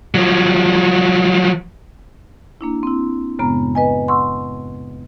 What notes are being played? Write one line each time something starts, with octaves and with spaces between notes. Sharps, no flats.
F3 F#3
A#3 D4 E4
C4 E4
F#2 A2 C#3 G#3 B3 A#5
B4 D#5 G#5
F#5 C6 C#6 E6